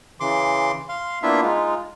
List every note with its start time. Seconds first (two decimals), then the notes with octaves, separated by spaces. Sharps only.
0.20 C#3 E3 C6 D6
0.89 F5 C6
1.23 A#3 B3 D4 E4 F4 E5
1.42 G#3 D#4 F4